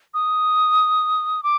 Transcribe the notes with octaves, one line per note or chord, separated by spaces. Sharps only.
D#6
D6